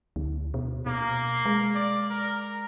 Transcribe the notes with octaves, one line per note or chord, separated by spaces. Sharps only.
D2
B2
B2 A#3
G#3
D5
A#4